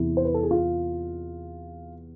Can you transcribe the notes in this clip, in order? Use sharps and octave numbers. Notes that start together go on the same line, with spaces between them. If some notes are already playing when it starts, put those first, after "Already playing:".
Already playing: E2 C3 E3 E4
C5
B4
A4
G#4
F4